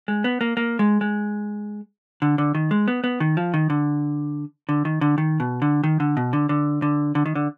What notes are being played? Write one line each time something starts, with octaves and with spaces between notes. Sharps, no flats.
G#3
B3
A#3
A#3
G#3
G#3
D3
D3
D#3
G#3
B3
B3
D#3
F3
D#3
D3
D3
D#3
D3
D#3
B2
D3
D#3
D3
B2
D3
D3
D3
D3
D#3
D3